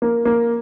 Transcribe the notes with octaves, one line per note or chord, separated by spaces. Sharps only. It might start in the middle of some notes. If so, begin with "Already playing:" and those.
A#3
A#3